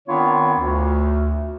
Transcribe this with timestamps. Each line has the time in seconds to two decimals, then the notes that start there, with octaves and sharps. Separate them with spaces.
0.08 D#3 B3 C4 D4 F4 C#5
0.59 D2